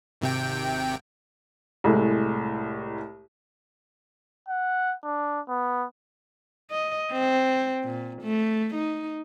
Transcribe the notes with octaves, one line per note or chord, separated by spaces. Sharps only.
G#1 C3 G5
C2 A2 G#3 A3
F#5
D4
B3
D#5
C4
A#2
A3
D#4